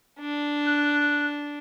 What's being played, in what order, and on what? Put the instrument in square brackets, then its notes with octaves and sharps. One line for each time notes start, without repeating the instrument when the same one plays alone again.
[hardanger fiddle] D4
[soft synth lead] F#6